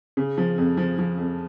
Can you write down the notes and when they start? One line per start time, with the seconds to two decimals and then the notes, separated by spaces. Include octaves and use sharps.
0.17 C#3
0.38 F3
0.58 F2
0.77 F3
0.98 F3
1.18 F2